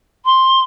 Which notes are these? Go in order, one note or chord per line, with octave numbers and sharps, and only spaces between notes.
C6